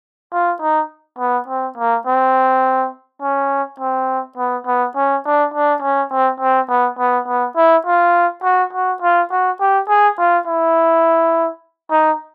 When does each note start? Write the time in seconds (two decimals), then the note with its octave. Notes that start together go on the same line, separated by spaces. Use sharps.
0.33 F4
0.61 D#4
1.19 B3
1.48 C4
1.78 A#3
2.07 C4
3.22 C#4
3.80 C4
4.37 B3
4.67 B3
4.96 C#4
5.25 D4
5.54 D4
5.82 C#4
6.12 C4
6.40 C4
6.69 B3
6.99 B3
7.27 B3
7.56 E4
7.86 F4
8.43 F#4
8.73 F#4
9.02 F4
9.31 F#4
9.60 G4
9.88 G#4
10.18 F4
10.47 E4
11.91 D#4